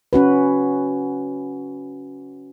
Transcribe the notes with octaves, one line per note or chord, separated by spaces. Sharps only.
C#4 F#4 B4